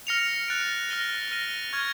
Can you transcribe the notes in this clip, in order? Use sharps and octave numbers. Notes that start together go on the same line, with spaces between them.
F6 A#6 C#7 F7
F#6 A6 D7
F6 A#6 D#7 G7
F6 A#6 D#7 G7
C#6 F6 G#6